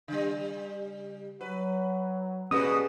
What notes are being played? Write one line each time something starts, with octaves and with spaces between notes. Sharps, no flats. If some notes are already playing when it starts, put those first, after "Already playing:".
C#3 G3
F#3 B4
B2 G3 A#3 C#4 F#4 G#4 B4 D#6